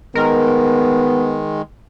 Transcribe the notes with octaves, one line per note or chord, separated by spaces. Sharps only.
D#3 G#3 B3 A#4